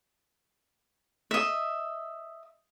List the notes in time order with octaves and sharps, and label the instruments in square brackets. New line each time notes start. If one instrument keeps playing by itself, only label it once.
[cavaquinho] D#5 E5